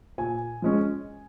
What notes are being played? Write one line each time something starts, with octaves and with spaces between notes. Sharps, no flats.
A#2 G#5
F3 G#3 C#4